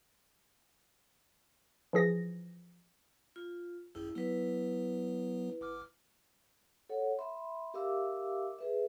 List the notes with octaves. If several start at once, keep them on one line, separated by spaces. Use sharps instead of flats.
E3 F3 G#4 A#6
F4
G#1 F#2 E4 G#4
F#3 B3 E4 B4
G1 D6 F6
A4 C#5 F#5
E5 B5 C6
G4 A#4 E5 F5 D6 E6
G#4 B4 E5